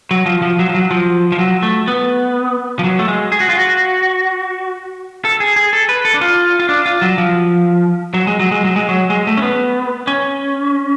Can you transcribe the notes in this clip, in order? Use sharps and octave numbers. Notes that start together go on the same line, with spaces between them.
F#3
F3
F3
F#3
F3
F#3
F3
F3
F#3
A3
B3
F3
F#3
A3
G#3
G#4
F#4
F4
F#4
A4
G#4
G#4
A4
B4
A4
D4
F4
F4
D4
F4
F#3
F3
F#3
G#3
F#3
G#3
F#3
G#3
F#3
G#3
A3
C#4
B3
C#4